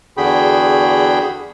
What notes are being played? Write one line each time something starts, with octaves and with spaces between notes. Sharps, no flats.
E2 D3 F#4 G#4 G5 B5